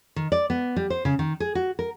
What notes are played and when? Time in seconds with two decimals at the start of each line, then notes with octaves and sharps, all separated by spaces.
0.16 D#3
0.32 D5
0.50 B3
0.76 G3
0.90 C5
1.05 C#3
1.19 D#3
1.40 G#4
1.55 F#4
1.79 A#4